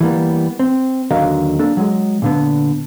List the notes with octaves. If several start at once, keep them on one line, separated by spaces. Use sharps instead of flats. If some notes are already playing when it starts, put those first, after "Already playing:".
E3 G3 A#3 B3
C4
D#2 D3 F#3 A#4 D#5 F5
A#3 D4 A4
F#3 G#3
A#2 D3 B3